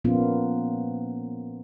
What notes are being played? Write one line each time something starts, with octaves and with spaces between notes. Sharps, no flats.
A#2 F3 A#3 B3 C#4 F4